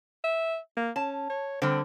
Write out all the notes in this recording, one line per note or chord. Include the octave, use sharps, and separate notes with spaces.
E5
A#3
C#4 A5
C#5
D3 G3 C4